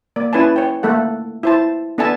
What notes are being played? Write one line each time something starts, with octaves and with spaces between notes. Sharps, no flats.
A#3 D5
C#4 E4 B4 C#5 G#5 A5
C#5 G5
A3 A#3 A4 F#5
E4 C5 A5
B3 D4 A4 E5 G#5 A5